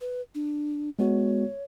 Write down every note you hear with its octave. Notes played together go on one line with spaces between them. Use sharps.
B4
D4
G#3 B3 F#4 C#5